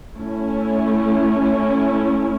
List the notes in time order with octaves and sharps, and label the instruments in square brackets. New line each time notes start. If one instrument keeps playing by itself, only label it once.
[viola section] A3 C#4 E4